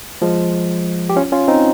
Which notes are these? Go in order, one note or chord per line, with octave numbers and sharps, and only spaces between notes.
F3 G#3
G4
C#4 F4
C#4 F4
C4 D#4